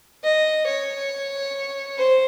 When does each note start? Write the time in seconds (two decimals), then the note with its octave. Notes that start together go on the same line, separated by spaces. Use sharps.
0.24 D#5
0.67 C#5
1.98 C5